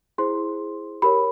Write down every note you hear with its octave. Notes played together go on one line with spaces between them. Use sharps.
E4 G#4 C5 C6
G4 A#4 C#5 B5